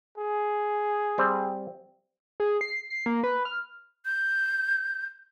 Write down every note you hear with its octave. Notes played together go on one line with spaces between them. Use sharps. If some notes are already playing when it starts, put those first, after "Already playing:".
G#4
G3 C4
G#4
C7
C7
A#3
B4
F6
G6